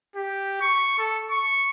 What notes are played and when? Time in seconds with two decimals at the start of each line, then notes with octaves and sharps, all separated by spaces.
0.15 G4
0.61 C#6
0.98 A4
1.30 C#6